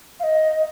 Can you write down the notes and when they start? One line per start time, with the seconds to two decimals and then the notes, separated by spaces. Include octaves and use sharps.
0.20 F5
0.23 D#5